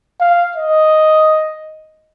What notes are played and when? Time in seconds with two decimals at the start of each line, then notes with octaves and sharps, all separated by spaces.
0.20 F5
0.55 D#5